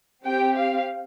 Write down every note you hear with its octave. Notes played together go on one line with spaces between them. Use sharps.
C4 G4 G5
F5